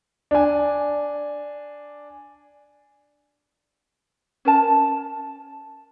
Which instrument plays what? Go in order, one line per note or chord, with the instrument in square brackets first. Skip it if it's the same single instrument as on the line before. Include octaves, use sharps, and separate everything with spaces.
[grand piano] D4 G#5
[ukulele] C#4 A#4 A5